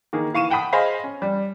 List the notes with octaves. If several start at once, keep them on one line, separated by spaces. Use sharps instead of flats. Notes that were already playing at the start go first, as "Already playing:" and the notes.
D#3 A#3 G#4
E3 F5 C#6 D#7 E7
F#5 G5 A5 B5 D#6
G#4 C5 D#5 F5 G#5 B5
C#4
G3